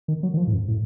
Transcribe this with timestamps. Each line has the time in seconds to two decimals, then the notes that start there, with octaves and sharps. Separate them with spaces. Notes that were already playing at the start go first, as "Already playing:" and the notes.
0.08 D#3
0.23 F#3
0.34 D#3
0.37 F3
0.47 A2
0.53 F#2
0.68 A2